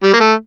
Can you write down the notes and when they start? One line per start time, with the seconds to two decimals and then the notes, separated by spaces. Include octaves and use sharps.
0.03 G3
0.13 A#3
0.20 A3